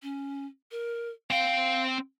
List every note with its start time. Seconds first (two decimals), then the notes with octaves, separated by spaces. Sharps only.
0.02 C#4
0.71 A#4
1.31 C4 F5 G5